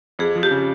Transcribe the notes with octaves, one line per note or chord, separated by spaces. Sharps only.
F2 G#4
F3
G4
C#3